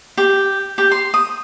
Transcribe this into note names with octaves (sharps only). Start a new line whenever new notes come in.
G4
G4
C6
D#6